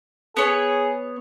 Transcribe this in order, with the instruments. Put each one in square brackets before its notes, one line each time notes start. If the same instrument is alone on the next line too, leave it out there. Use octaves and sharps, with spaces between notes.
[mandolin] B3 C#5 [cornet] G#4